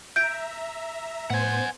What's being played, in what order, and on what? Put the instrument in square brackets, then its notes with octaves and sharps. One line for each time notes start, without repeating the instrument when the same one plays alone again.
[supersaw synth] E5 A#5 [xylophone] G6 D7
[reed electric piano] A2 [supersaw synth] B3 C5 [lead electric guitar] F#5 G#5